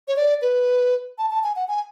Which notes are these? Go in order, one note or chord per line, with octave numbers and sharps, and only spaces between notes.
C#5
D5
B4
A5
A5
G#5
F#5
G#5